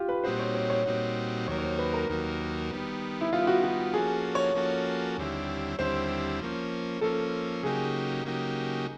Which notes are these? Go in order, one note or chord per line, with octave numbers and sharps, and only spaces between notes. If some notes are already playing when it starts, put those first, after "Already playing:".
Already playing: F4 G4
B4
A#2 G3 C4 D#4 F#4 C5
C#5
C#5
C#5
A#2 G3 C4 D#4 F#4
D#2 D#3 F#3 A#3 C#5
C#5
C5
B4
A#4
D#2 D#3 F#3 A#3
D#3 G3 B3
E4
D#3 G3 B3 F4
F#4
F#4
F3 A#3 C#4 F#4 G#4 A4
C#5
F3 A#3 C#4 F#4 A4
D#2 D3 G3 C4 E4
D#2 D3 G3 C4 E4 C5
F3 A#3 C#4
F3 A#3 C#4 A4
C#3 F#3 A#3 D#4 G4 G#4
C#3 F#3 A#3 D#4 G4